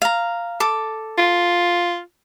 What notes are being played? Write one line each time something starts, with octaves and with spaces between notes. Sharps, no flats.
F5 A#5
A4 D6
F4